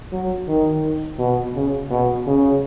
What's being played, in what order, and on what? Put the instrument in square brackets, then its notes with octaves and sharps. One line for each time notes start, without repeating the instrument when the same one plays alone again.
[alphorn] F#3
D#3
B2
C#3
B2
C#3